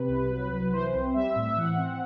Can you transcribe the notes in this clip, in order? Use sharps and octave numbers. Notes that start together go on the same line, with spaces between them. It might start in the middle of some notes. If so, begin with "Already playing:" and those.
Already playing: C3 B4
C2
F#3
C2
E3 C5
C4
G3 E5
A2
E3 F#5
C4